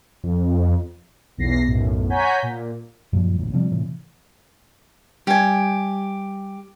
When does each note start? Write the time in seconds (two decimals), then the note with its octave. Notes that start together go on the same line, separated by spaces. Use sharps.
0.24 F2
1.37 B1 E2 A#6 C7
1.66 B1 F#2 A2
2.10 C#5 F#5 G#5 A#5 G6 B6
2.43 A#2
3.13 F#2 A#2 F3
3.38 E1 A1 D2
3.53 C3 F3 G3
3.72 A2 C3 E3
5.27 G3 G4 G#5